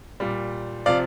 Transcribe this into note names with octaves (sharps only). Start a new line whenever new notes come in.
A#2 G3
C3 F3 D5 F5